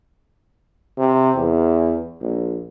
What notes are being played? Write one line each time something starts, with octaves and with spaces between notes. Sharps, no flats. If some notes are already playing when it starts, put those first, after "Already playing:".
C3
E2
A#1